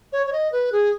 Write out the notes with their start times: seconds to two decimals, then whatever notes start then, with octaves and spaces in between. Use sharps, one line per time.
0.12 C#5
0.27 C#5
0.33 D#5
0.52 B4
0.72 G#4